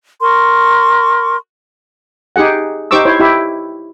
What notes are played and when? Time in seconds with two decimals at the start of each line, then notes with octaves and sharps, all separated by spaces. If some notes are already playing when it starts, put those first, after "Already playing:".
0.21 A#4 C6 C#6
2.36 D#4 G4 G#4 F#5
2.91 D#4 G4 C5 C#6 D6 E6
3.05 E4 C5 C#5
3.19 E4 G4 E5